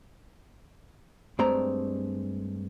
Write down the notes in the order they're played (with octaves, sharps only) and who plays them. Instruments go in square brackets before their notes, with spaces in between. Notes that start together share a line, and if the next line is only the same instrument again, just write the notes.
[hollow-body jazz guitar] G2 G#3 A3 C4 D5 A#5